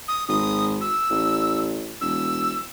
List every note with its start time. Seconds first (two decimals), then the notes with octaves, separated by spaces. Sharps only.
0.08 D#6
0.28 G#1 D#6
0.81 E6
1.10 A1
2.01 E1 E6